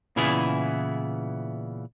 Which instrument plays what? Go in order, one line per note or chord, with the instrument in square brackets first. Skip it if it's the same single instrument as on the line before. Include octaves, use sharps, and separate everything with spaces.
[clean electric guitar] A#2 C#3 E3 B3 E4 G#4